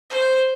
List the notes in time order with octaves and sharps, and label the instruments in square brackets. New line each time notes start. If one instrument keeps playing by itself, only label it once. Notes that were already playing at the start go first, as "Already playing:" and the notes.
[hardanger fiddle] C5